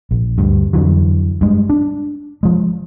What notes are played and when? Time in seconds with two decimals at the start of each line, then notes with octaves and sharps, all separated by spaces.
0.11 A#1
0.38 D2 G2
0.73 F2 D3 E3 F#3
1.41 G2 G#3
1.69 D4
2.43 F3 G#3